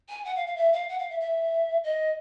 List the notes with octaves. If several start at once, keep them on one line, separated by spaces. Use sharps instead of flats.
G#5
F#5
F5
F5
E5
F5
F#5
F5
E5
E5
D#5